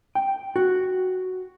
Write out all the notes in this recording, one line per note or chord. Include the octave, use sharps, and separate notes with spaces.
G5
F#4